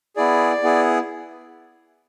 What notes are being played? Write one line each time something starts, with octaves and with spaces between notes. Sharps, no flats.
B3 E4 G#4 D5
B3 E4 G#4